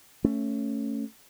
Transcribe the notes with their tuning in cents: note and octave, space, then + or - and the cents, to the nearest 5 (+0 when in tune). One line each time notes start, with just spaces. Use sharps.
A3 +15 C#4 +0